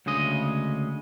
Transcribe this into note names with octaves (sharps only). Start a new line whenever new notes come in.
D2 C#3 G#3 D#5